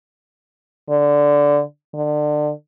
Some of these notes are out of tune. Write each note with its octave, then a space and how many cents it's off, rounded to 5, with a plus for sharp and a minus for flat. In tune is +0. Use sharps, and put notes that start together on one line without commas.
D3 -10
D3 +30